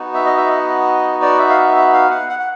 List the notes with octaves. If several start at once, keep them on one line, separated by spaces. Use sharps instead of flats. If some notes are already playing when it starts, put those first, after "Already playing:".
Already playing: B3 D#4 F#4
E5
D#5
E5
D#5
D5
E5
F5
E5
E5
F5
F#5
F#5
F#5